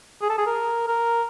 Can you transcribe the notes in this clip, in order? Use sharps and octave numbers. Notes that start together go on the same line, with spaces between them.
G#4
A4
G#4
A#4
A#4